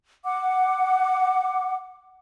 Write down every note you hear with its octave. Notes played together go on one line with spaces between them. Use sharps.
F#5 D6